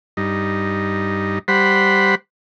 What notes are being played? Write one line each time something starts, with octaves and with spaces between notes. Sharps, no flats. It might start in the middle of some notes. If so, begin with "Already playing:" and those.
G2 D#4
G3 C5 F#5 B5